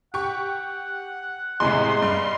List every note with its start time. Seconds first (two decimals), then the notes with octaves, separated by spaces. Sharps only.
0.14 G4 F#5 C#6
1.60 E2 A2 C3 G#3 C6
2.02 G2